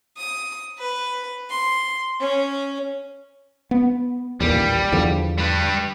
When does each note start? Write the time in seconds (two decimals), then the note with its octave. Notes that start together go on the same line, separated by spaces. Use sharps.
0.17 D#6
0.78 B4
1.49 C6
2.20 C#4
3.71 B3
4.40 A1 D#2 A#2 G3
4.92 E2 D3 F3
5.38 G3 B4